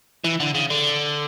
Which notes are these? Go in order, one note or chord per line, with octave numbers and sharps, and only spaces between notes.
E3
D3
C#3
D3